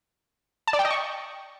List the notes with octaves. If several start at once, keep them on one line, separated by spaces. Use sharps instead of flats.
A5
D5
G5
D#5
C#6